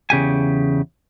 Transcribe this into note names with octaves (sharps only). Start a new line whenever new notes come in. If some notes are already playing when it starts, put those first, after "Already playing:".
E2 C#3 G4 G#5